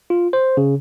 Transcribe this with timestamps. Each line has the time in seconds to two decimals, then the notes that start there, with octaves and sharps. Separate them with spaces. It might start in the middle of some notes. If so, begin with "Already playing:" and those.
0.10 F4
0.33 C5
0.57 C#3